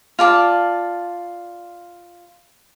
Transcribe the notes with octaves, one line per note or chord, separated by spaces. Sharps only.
F4 D5 A5